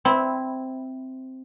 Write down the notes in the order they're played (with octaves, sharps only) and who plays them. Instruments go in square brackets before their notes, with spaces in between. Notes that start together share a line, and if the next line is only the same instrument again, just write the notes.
[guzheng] C4 E4